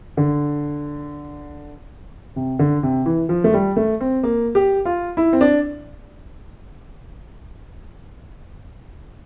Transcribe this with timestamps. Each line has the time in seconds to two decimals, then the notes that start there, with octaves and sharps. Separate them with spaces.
0.17 D3
2.36 C3
2.59 D3
2.83 C3
3.06 E3
3.29 F3
3.44 A3
3.54 G3
3.76 A3
4.00 C4
4.23 A#3
4.55 G4
4.85 F4
5.17 E4
5.33 C4
5.41 D4